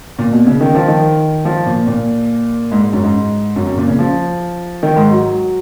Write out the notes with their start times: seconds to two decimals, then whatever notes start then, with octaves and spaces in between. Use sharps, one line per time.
0.19 A#2
0.32 B2
0.47 C#3
0.61 D#3
0.75 F3
0.88 D#3
1.45 F3
1.66 A#2
1.87 A#2
2.72 G#2
2.82 G#2
2.93 F#2
3.03 G#2
3.56 F#2
3.67 F#2
3.77 A#2
3.88 C#3
3.99 F3
4.83 D#3
4.97 G#2
5.11 F#3